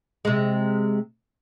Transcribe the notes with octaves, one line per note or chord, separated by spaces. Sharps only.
C3 G#3